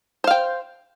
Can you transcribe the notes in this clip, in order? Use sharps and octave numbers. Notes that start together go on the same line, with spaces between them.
C5 F5 G5